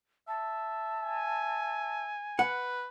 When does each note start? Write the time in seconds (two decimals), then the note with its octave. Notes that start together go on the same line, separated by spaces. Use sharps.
0.28 E5 A5
1.01 G#5
2.39 B4 F#5